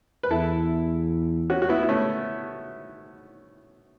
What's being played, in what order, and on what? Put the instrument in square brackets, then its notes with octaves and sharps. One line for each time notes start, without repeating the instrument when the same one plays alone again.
[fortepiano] B4
[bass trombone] E2 [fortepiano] E4 A4
[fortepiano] C#4 F#4
F#4
B3 E4
E4
A3 C#4